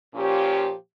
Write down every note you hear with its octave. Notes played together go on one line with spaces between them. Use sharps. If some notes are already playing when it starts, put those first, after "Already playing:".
A#2 F3 C#4 G4 C#5